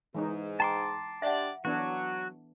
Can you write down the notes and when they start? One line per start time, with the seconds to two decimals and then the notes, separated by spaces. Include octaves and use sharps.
0.14 G#2 E3 G#3 D#4
0.60 G5 A5 A#5 C6 D6
1.22 D4 G4 D5 E5 F#5
1.65 E3 F#3 B3 D4 F#4